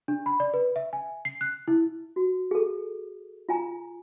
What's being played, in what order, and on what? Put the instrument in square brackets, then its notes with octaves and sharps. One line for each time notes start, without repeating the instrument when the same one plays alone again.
[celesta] D4
B5
D5
B4
E5
G#5
C7
F#6
E4
[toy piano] F#4
G#4 A4
F4 G#5 A#5